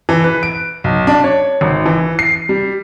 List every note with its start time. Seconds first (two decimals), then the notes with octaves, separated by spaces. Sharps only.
0.09 E3
0.24 B4
0.43 D7
0.84 B1
1.07 D4
1.24 C#5
1.61 G#1
1.86 E3
2.19 C7
2.49 G3